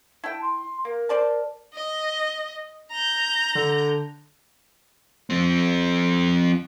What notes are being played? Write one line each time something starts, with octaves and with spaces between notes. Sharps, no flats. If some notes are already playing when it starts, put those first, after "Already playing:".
E4 G5 A5
C6
A#3 A#4
C5 D5 A5
D#5
A#5 G6
D3
F3 C4